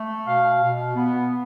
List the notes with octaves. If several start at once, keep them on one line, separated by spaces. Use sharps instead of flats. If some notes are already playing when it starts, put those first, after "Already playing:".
Already playing: A3
B2 F5
B2
B3